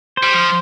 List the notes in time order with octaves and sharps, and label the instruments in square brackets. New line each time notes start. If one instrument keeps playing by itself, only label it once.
[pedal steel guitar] C5
[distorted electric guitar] G3
F3